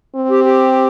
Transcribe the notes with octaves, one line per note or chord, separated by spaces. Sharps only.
C4
G4
G4